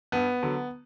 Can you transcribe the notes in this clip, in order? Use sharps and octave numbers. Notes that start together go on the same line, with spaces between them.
G2 B3
D3 F#3